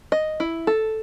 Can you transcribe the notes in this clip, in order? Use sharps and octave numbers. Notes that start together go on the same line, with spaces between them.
D#5
E4
A4